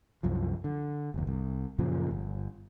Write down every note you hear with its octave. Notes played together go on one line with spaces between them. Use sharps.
C2 F#2 F3
D3
F#1 D#2
C2
F#2 A#2 C#3 F3
G1